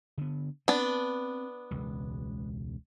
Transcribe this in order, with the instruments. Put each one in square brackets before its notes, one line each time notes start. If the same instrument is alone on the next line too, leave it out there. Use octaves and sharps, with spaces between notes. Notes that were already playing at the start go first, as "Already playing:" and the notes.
[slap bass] D3 B3
[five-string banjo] B3 D4 [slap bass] C4
[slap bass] E1 C#2